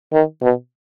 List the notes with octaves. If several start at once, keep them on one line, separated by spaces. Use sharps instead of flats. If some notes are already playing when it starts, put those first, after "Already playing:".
D#3
B2